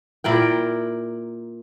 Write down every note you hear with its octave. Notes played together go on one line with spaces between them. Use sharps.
A#2 E4 A#4 G5